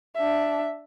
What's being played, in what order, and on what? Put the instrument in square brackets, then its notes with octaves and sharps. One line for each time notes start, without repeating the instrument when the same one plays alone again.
[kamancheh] D4 E5